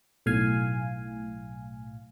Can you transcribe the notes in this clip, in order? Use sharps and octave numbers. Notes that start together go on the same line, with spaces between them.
B1 A2 F5 G#5